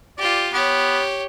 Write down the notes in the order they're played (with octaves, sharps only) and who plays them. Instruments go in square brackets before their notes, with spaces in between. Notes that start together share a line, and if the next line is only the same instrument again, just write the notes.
[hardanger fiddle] F4 G4 [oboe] D5
[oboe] B3 [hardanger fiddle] G4 C#5